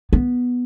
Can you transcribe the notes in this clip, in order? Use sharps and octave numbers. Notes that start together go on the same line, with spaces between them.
B3